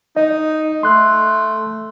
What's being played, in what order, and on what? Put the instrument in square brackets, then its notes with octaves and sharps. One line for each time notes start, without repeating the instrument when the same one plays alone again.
[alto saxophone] D#4 [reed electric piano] D#5
[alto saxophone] A3 [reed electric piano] C6 F#6